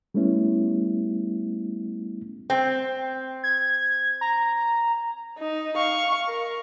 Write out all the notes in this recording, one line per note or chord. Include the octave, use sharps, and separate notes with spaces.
G3 A3 B3 C#4 E4
C4
G#6
A#5
D#4
F5 C#6
A#4